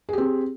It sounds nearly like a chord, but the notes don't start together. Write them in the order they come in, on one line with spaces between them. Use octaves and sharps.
G#4 G4 C4